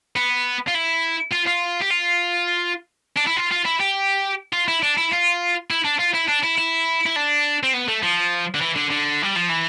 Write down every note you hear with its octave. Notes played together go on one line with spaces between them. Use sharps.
B3
F4
E4
F4
F4
G4
F4
D4
E4
F4
F4
E4
G4
F4
E4
D4
E4
F4
E4
D4
F4
E4
D4
E4
E4
E4
D4
C4
B3
A3
F3
D3
E3
D3
D3
G3
F3
E3